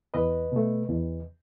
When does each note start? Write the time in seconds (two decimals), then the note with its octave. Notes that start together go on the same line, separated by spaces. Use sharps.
0.14 E2 B4 D#5
0.52 B2 A3
0.89 E2